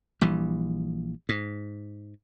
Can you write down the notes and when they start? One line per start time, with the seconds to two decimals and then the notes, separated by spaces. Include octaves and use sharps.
0.21 A#1 E3 G3
1.29 G#2